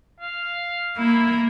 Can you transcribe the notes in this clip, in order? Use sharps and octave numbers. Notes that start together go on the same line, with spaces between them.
F5
A#3 E4